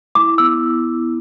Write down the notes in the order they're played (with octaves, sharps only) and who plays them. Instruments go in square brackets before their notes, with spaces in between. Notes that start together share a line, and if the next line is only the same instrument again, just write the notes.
[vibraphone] E4 [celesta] D6
[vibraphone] B3 [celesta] E6